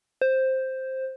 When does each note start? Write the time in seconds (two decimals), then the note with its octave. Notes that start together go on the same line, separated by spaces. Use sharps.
0.21 C5